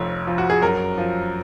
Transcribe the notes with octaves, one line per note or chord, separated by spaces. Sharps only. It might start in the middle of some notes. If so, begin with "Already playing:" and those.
Already playing: F1 F2 F3 C#5
F3
F#4
G#4
F#2 A#4
F3